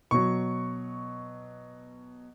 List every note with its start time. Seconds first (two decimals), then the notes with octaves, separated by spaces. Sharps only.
0.11 B2 F#3 C#6